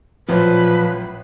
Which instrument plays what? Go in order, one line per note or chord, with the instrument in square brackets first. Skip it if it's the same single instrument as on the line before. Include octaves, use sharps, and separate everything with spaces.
[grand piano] A1 F#3 C5 [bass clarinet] A#2 [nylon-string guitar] F3 [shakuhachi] B4